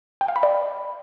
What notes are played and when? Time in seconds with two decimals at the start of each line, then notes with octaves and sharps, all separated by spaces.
0.21 G5
0.28 F5
0.36 B5
0.43 D5